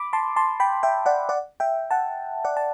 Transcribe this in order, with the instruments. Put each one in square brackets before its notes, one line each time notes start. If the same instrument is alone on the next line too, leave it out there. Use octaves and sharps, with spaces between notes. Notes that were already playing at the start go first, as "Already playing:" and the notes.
Already playing: [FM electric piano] B5 D6
A5 C6
A5 C6
G5 B5
E5 G5
D5 F#5
D5 F#5
E5 G5
F#5 A5
D5 F#5
A5